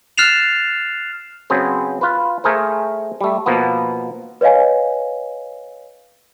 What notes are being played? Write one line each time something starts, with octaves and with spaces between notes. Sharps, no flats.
F6 F#6 A6 C7 E7 F7
C#3 F#3 B3 C4 G#4 C5
F4 B4
A3 G#4 A#4 C5
G3 A3
B2 F3 A#3 B3
B4 C#5 D#5 F5 G#5